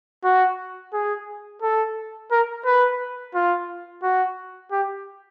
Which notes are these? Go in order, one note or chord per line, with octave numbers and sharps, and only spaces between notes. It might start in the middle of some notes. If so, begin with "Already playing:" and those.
F#4
G#4
A4
A#4
B4
F4
F#4
G4